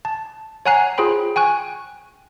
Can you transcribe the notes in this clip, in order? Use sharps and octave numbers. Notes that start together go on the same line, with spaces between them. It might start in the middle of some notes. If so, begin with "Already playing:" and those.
A5
C#5 F#5 G#5 A#5 F#6 C7
F4 G#4 C5 G5 B5
G5 G#5 C#6 F#6